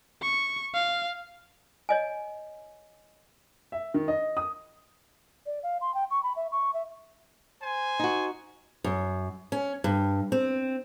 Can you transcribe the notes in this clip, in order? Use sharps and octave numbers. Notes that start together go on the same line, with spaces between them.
C#6
F5
C#5 D#5 G#5
E5
D#3
D#5
D#6
D5
F5
C6
G5
C#6
B5
E5
C#6
E5
C5 G#5
D#4 F#4
F#2
C#4
G2
C4